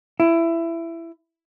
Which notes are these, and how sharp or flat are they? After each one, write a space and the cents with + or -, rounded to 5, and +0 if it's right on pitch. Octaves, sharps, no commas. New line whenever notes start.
E4 +15